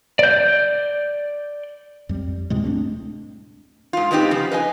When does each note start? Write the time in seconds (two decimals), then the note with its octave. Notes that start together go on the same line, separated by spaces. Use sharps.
0.19 D5 G6
2.09 F2 G3
2.50 D#2 A2 C3 G#3
2.64 A3 C4 D4
3.93 G#2 F4
4.11 G#3 B3 C4 D#4 E4 G4
4.31 C#3 F3
4.52 B4 D#5 G#5